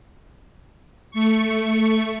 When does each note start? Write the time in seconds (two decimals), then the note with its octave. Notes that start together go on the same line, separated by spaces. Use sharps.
1.11 A3 C#6